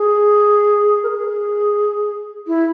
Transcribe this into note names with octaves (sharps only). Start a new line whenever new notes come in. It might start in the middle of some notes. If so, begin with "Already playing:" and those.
Already playing: G#4
A#4
G#4
E4